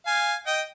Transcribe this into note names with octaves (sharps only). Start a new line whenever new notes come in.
F5 G#5
D#5 G5